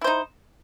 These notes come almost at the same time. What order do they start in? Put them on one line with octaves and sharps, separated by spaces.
E4 C5 D#4